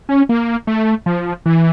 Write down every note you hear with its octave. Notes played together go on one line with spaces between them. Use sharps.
C#4
A#3
A3
F3
E3